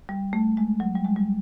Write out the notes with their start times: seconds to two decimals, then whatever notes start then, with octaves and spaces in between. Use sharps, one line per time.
0.09 G3
0.33 A3
0.57 G#3
0.80 F#3
0.95 G3
1.05 G#3
1.16 G3